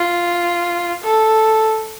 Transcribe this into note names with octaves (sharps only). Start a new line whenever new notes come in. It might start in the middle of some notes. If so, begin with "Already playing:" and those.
Already playing: F4
A4